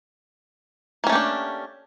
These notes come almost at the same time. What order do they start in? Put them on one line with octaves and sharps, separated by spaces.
A#3 C#4 A3 G4 D4